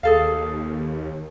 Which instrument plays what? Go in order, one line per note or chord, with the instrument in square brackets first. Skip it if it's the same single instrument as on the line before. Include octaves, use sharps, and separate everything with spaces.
[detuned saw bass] D#2 [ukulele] G#4 A4 F5